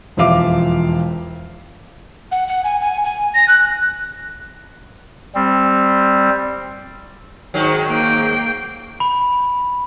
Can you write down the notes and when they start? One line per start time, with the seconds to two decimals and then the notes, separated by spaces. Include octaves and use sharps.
0.17 E1 F2 F4 E5 F5 D6
2.32 F#5
2.48 F#5
2.64 G#5
2.81 G#5
3.04 G#5
3.34 A#6
3.48 F#6
5.35 G3 C4
7.54 G#2 D#3 F#3
7.88 A#3 G5
9.00 B5